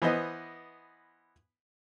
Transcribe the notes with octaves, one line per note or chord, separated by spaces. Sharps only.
E3 B3 C5 D#5